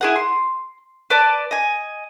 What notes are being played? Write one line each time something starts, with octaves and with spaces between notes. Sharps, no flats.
E4 G#4 F#5
C6
B4 D5 A5 D6
D#5 G#5